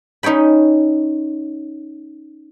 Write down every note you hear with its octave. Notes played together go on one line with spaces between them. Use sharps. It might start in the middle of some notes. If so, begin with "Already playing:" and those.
C#4 D#4 C#5 G5 B5